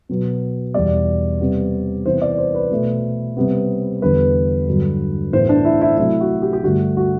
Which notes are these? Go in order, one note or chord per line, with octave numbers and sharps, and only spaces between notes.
B2 F#3 B3
E2 B2 G3 D5
C3 G3 B3
C3 E3 B3 C5
D5
C5
B4
B2 A3
C3 G3 B3
E2 D3 G3 B3 B4
G2 D3 F#3
A2 E3 B3 C5
D4
E4
E4
C3 F#3 A3 E4
F#4
G4
G4
G2 D3 A3 F#4
F#4